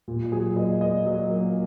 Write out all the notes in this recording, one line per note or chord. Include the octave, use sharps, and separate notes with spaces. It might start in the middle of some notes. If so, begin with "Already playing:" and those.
A#2
F#3 G#4
A#3 D#5
A#3 D#5
F#3 D#5
A#3